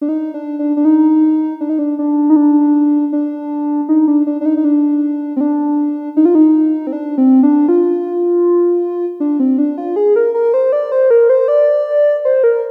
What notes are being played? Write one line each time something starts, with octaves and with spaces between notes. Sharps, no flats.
D4
D#4
D4
D4
D4
D#4
D4
D#4
D4
D4
D#4
D4
D4
D#4
D4
D4
D4
D#4
D#4
D4
C4
D4
D#4
F4
D#4
C4
D4
C4
D4
F4
D4
C4
D4
F4
G#4
A#4
A#4
C5
D5
C5
A#4
C5
D5
C5
A#4